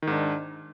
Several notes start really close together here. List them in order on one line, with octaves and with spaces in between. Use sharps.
D#3 G#2 D4